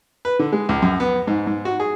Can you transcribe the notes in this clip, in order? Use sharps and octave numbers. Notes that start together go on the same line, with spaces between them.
B4
D3
G#3
C#2
F#2
B3
G#2
G#2
F#4
G#4